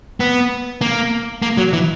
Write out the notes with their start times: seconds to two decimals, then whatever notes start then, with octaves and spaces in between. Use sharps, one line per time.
0.20 B3
0.81 A#3
1.42 A#3
1.58 F#3
1.73 E3